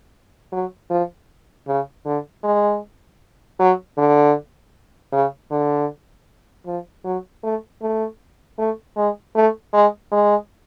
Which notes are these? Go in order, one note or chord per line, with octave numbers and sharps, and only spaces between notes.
F#3
F3
C#3
D3
G#3
F#3
D3
C#3
D3
F3
F#3
A3
A3
A3
G#3
A3
G#3
G#3